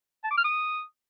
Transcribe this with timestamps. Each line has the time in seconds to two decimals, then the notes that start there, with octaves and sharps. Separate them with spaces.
0.24 A5
0.31 D6
0.38 F6
0.44 D#6